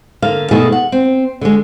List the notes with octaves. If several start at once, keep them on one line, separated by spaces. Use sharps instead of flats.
D3 A#3 F5
B2 D#3 A3 F#4 G#4
F#5
C4
D3 G#3